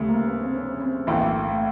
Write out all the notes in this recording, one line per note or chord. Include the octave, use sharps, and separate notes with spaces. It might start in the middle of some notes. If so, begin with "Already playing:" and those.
Already playing: D2 C#3 G3 A3
A#3
B3
C4
C#4
C4
B1 A2 E3 A#3
A3